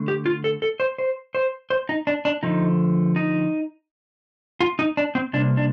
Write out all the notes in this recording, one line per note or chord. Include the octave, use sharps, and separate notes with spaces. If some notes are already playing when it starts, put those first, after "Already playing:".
Already playing: D3 A3
G4
F4
A4
A4
C5
C5
C5
C5
D#4
D4
D4
D3 F3 A3 D#4
D#4
F4
D#4
D4
C4
C3 G3 A#3 D4
D4